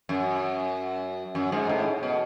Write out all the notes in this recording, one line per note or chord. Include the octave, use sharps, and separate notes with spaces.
F#2
F#2
G#2
A2
B2